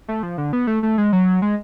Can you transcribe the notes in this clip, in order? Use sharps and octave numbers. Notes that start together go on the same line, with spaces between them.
A3
F3
D3
B3
A3
A3
G#3
F#3
G#3